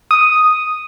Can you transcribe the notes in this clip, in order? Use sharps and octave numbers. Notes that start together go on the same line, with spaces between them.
D#6